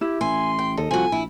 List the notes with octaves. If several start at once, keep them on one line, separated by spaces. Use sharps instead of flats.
E4 G4
A1 G#5 C6
G5
D#2 A4 D#5
C2 F3 F#4 G#5
A#1 E4